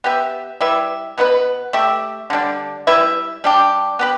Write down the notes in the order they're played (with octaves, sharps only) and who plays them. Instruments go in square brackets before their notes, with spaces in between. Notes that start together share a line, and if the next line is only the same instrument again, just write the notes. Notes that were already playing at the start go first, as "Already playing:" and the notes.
[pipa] B3 G4 B4 E5
G3 E4 B4 E5
B2 B3 E4 B4
A3 G4 E5
D3 G3 D4
G3 E4 B4 E5
G3 D4 G4
B3 G4 B4